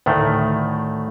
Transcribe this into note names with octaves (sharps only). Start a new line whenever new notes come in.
D2 A2 D#3 A3